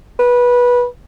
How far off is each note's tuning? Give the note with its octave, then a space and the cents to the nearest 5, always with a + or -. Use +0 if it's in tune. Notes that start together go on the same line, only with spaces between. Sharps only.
B4 -20